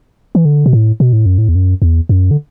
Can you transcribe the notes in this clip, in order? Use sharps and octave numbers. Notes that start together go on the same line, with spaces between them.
E3
D3
B2
A2
B2
A2
F#2
A2
E2
F#2
E2
F#2
D3